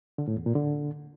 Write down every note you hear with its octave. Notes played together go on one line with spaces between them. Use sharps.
D3
A2
E2
A#2
D3